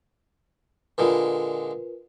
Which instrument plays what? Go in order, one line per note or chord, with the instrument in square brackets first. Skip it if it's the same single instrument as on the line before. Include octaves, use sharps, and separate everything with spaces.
[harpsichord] A#2 D3 G#3 [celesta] F4 A#4 B4